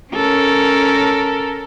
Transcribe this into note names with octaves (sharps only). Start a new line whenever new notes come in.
C#4 A4 A#4